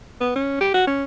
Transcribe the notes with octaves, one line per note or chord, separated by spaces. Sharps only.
B3
C#4
G4
F#4
C#4